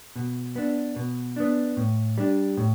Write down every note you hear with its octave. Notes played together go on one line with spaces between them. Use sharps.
B2
B3 D4
B2
B3 D4
A2
G3 D4
A2